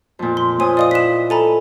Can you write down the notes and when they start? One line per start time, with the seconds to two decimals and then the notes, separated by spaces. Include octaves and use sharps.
0.19 F2 A#2
0.37 C6
0.60 A#2 C5 C#5 G#5 D#6
0.77 D5 D#5 F5 D#6
0.91 E4 F#6 B6 E7
1.30 A4 G#5 A#5 B5